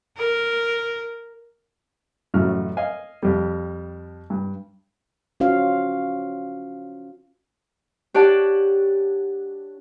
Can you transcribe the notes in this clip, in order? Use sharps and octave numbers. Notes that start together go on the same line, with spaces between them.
A#4
A1 F#2 C#3 F#4 F6
D#5 F5 G#5
F2 G3
G2
C#4 F4 F#4 C5 F5
D4 G4 C#5 D5 F#5 A5